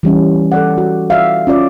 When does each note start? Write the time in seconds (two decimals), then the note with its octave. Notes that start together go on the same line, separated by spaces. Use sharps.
0.03 E3 G3 C#4
0.52 A4 D5 F#5
0.78 F#4
1.10 D5 E5 F5
1.47 C#4 F4 D5